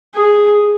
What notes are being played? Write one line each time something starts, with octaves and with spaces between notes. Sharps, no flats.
G#4